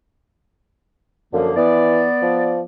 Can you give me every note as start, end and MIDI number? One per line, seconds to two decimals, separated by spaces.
1.33 1.51 42
1.33 1.54 50
1.33 1.54 53
1.33 1.54 58
1.57 2.04 52
1.57 2.64 59
1.57 2.64 74
2.22 2.61 53